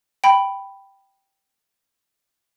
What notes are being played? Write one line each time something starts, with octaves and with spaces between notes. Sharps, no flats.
G5 B5